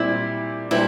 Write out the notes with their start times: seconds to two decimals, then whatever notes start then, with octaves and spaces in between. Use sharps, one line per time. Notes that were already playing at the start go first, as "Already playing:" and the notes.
Already playing: A#2 G3 C4 E4 G4 D5
0.71 A#2 G3 D4 E4 G4 C5